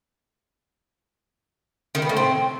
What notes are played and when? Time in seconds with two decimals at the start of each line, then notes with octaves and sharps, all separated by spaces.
1.95 D#3
2.02 B3
2.09 A2
2.17 C4